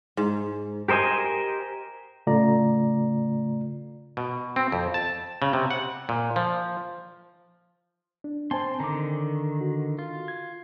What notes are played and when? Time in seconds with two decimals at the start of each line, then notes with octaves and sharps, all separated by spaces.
0.17 G#2
0.88 G4 A#4 C5 D#5 G#5
2.26 A2 C#3 A3 F4 D5 A#5
4.17 B2
4.56 C4
4.72 F2
4.94 A5
5.42 C#3
5.53 C3
5.71 F#5
6.09 A#2
6.36 F3
8.24 D4
8.51 C4 C5 G#5 A5 C6
8.80 D3 D#3 A#5 D6
9.61 F#4
9.99 F4
10.28 G#6